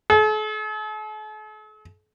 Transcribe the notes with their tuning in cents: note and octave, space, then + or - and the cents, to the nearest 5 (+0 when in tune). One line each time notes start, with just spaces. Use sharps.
A4 -45